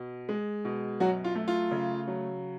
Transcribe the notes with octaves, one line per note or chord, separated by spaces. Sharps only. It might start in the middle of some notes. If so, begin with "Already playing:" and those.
Already playing: B2
G#3
B2
F#2 F#3 F#4
F4
A3
F4
C#3
F#3